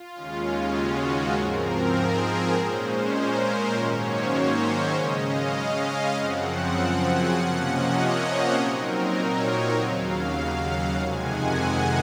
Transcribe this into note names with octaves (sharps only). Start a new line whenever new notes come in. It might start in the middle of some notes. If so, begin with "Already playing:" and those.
Already playing: F4
D#2 C#3 G#3 C#4
F#4
G#4
G#2 F3 C4 A#4
G#4
A#4
A#2 G#3 C#4 C5
C5
A#4
G#2 D#3 F#3 A#3 C#4 C#5
C5
C5
C#3 G#3 C#4 D#5
F5
F5
D#5
F#2 C#3 F3 C4 F#5
G#5
C3 F3 A#3 C#4 F#5
D#5
C#5
C5
A#2 F#3 C4 D#4 A#4
C#5
D#5
D#2 C#3 F#3 F5
F#5
F2 C3 D#3 G#3 G#5
F#5
F#5